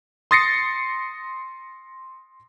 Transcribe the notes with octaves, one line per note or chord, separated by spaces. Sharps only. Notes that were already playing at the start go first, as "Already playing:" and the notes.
C6 D#6 A6 A#6 C7 C#7